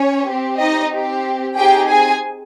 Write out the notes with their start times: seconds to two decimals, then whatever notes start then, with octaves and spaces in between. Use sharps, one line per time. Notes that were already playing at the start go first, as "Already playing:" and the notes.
Already playing: C#4 C#5
0.29 C4 G4
0.60 D#4 D#5
0.93 C4 G4
1.57 C4 D#4 G4 G#4 G5
1.89 G#4 G#5